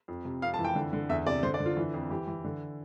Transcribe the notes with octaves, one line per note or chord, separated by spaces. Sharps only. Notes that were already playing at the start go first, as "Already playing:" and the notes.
F2
C3
F2 F5
A5
E3
G5
D3
D3
E2 E5
C3 D5
D3 C5
D5
D3
F4
E3
F2
E3 G4
E3
D3